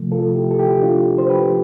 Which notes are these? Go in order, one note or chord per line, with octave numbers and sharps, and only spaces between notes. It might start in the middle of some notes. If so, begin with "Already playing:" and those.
Already playing: C3 F3 A3
F4 A4
E4 G4
A4
E4 G4
D4 F4
C5
G4 B4